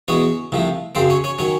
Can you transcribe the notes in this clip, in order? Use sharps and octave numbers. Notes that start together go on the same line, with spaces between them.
E2 B2 G#3 C#4 C#5
C2 C3 F3 A3
F#2 C#3 F#3 C4 C5
C#4 C#5
C#4 C#5
D#3 F#3 C#4 C#5